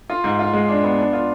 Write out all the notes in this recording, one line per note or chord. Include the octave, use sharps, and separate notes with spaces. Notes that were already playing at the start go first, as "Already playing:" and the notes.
F4
G#2
F4
G#3
D4
B3
D4
F4